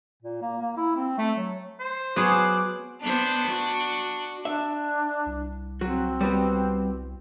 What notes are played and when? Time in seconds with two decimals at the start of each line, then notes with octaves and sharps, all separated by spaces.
0.23 A#2
0.42 A#3
0.61 A#3
0.77 E4
0.96 C4
1.18 A3
1.37 F#3
1.79 C5
2.16 F#3 B3 G#4 D6 F#6
3.03 B3 D4 C5
3.48 F#4
4.45 D4 E5
5.26 C2
5.81 F#3 C4 F#4
6.21 G3 B3 F#4